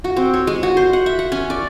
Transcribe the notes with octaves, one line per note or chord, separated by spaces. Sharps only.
F#4
C4
C#5
G#3
F#4
C5
F#5
E5
F#5
C#4
D5